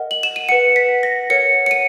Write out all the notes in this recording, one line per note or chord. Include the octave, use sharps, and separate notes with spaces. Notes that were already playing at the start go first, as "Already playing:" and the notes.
Already playing: A#4 D#5 F#5
F#7
E7
D#7
B4 F#5 C#7
B6
A#6
A#4 C#5 F#5 C#7
C#7
D#7